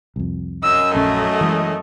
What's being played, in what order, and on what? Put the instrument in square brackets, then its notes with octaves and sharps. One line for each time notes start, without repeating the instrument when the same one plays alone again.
[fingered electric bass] C2 F2
[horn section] F#2 D#5 [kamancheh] E6
[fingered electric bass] A#1 C#4 [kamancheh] A3
[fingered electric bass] E3 G#3